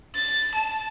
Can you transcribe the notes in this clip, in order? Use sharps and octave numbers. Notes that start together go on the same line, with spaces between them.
A6
A5